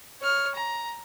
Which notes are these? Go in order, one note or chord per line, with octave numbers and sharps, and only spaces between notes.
C#5 F6
A#5